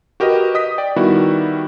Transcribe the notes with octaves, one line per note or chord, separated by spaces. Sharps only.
F#4 G4 A#4 B4 D#5
D#5 D#6 B6
D5 G5
D#3 G3 B3 E4 F#4